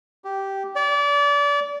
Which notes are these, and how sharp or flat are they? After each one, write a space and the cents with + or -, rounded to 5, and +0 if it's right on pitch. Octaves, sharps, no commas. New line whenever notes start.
G4 -10
D5 -30